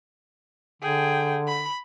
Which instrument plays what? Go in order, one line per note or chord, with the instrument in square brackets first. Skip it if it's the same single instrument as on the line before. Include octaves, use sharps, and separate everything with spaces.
[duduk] D3 [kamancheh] G#4 G5
[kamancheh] B5